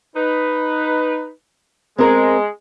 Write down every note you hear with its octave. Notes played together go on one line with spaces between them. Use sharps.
D#4 B4
G#3 C4 A#4